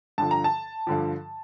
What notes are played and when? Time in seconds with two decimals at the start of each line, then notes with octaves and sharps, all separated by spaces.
0.18 G2 D3 F3 A5
0.31 A#5
0.44 A5
0.87 G2 D3 F3